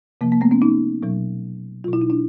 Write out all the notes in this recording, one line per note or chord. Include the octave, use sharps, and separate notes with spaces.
C3 F3 A#3
A#3
A3 B3
B3 C#4
C#4 D#4
B2 F#3
B2 F#3 F4
E4
D#4
D4 E4